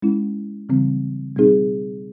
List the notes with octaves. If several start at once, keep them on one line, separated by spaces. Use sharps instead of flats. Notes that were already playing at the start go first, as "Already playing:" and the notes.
G#3 C#4 E4
C#3 E3 G3 C4
B2 G3 C4 D#4 G#4